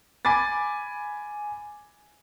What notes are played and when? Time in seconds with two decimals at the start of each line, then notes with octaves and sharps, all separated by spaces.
0.25 G#5 B5 D6 A6